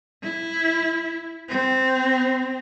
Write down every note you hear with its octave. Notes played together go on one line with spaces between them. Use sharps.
E4
C4